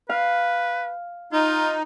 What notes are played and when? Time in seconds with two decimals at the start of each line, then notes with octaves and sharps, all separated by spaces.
0.09 B4 F5
1.33 D#4 F4